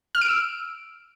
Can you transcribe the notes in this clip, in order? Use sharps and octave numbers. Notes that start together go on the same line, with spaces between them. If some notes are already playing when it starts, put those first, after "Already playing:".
F6
D7
E6